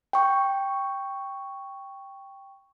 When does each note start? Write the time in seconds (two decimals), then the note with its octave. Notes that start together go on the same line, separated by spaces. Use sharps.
0.13 G5 C#6